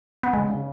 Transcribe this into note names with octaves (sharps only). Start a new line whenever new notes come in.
B3
C#3 G#3
C#3